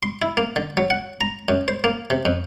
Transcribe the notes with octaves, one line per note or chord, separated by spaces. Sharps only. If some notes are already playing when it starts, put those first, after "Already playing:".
C6
E4
A#3
D3
F#3
F#5
A#5
F#2
C5
A#3
C3
F2